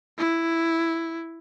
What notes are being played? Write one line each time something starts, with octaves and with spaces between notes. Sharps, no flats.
E4